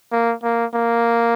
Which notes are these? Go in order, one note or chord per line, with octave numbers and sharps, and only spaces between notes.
A#3
A#3
A#3